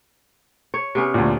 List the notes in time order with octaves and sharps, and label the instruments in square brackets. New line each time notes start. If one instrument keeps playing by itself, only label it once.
[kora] C#5
C3 B3 C#4
[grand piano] D2 A#2